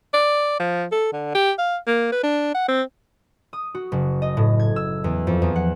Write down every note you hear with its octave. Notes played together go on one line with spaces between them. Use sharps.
D5
F3
A4
D3
G4
F5
A#3
B4
D4
F#5
C4
D#6
F#4
F#1
D#5
A2
G#6
E6
E2
F2
E2
F#5